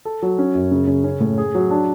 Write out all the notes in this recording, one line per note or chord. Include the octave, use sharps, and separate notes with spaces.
A4
F#3
C#4
F#2
C#3
C#3
C#4
A2
G#4
F#3
D4